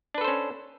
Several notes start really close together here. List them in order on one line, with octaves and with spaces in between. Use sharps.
D4 B4 A4 C5 C#4